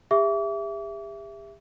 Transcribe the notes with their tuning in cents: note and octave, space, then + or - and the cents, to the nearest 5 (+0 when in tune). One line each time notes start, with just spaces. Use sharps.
G4 +45 E5 +10 D6 -40